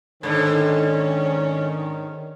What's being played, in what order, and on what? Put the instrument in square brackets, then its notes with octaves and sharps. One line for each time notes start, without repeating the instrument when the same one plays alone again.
[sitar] G#2 D3 [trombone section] D#3 [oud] A3 A4 [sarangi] C#4